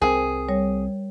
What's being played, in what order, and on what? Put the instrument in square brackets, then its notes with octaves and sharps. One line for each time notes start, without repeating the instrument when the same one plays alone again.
[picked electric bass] C2 E3 C4 [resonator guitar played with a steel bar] G#4 [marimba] A#4 C5
[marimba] G3 C#5